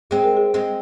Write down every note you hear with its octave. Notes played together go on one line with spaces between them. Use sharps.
G#3 C4 G#4
A#4
G#4
G#3 C4